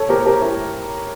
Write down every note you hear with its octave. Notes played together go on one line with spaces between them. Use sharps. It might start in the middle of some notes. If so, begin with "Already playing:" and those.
Already playing: A4 C#5
G4 A#4
G4 A#4
E4 G4